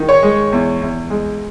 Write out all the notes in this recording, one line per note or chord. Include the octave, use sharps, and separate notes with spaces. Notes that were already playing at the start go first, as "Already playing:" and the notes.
Already playing: D#3
C#5
G#3
E2
E2
G#3